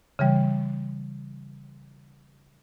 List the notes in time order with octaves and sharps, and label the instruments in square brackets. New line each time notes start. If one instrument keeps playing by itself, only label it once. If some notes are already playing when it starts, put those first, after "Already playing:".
[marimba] C#3 E3 G3